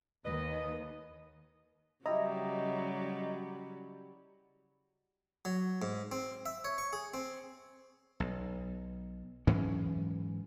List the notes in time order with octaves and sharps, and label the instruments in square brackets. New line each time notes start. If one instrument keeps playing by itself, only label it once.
[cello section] D#2 [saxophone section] B4 D#5
[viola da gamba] C#3 F#3 G3 [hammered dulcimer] E4 G4 [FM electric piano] D#5 A#5
[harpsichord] F#3
G#2
C4
E5
C#5
C#6
G#4
C4
[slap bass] B1
G#2 E3 F#3 C#4